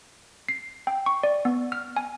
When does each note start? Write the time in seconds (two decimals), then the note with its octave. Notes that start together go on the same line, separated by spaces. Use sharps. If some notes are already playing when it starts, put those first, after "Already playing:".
0.49 C7
0.87 G5
1.06 C#6
1.23 D5
1.45 B3
1.72 F6
1.97 G#5